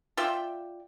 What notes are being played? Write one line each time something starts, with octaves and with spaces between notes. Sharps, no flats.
F4 D5 E5 G5